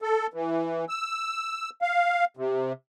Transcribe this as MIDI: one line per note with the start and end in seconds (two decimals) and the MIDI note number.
0.02 0.27 69
0.34 0.85 52
0.89 1.70 88
1.82 2.25 77
2.37 2.73 48